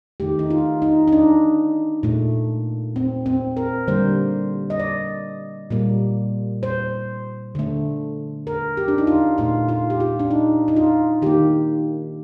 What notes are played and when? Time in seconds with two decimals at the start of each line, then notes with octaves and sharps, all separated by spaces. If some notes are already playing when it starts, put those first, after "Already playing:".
0.20 D#3 A3 G4
0.39 D#4
0.50 F4
0.82 D#4
1.08 D#4
1.13 D4
2.03 A#2 A3
2.96 C4
3.26 C4
3.57 A#4
3.87 D3 G3 A#3 C5
4.70 D#5
4.80 D5
5.70 A#2 G3 A#3
6.63 C5
7.55 D3 A3
8.47 A#4
8.77 G4
8.88 D4
8.98 D#4
9.07 F4
9.38 A#2 A3 F4
9.69 F4
9.90 G4
10.00 F4
10.19 D4
10.31 D#4
10.68 D#4
10.76 F4
11.22 D#3 A#3 G4